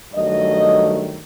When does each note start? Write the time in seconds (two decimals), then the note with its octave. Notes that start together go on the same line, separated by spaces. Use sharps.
0.14 G2 D#3 F#3 A3 D#5